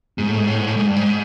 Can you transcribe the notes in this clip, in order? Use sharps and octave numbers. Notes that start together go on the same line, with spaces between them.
G#2
A2
G#2
A2
G#2
A2
G#2
G2
G#2